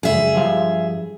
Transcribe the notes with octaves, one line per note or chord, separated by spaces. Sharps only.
C#2 F#2 G#4 E5
G2 F3 F5